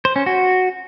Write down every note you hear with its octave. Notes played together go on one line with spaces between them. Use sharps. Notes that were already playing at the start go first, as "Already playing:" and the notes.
C5
C#4
F#4